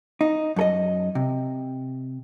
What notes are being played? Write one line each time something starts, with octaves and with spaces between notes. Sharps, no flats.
D#4
F#2 A4 D#5
C3